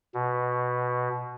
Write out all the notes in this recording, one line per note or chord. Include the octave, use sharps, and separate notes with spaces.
B2